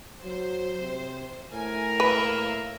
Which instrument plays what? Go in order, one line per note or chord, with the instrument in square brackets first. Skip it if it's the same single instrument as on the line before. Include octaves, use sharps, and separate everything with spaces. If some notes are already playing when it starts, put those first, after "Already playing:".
[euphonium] F#3 [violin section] C5
[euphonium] C3
[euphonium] A2 [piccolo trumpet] A#4 [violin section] G#5
[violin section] A#3 E5 [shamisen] B4